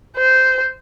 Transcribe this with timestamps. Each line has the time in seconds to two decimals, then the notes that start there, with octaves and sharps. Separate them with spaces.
0.17 C5